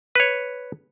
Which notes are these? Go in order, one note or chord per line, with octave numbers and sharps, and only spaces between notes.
B4 C#5